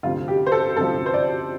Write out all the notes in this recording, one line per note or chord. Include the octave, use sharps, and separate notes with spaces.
D2 C3 F3 F4
G4
C5
A4
D2 C3 F3 A4
C5
D5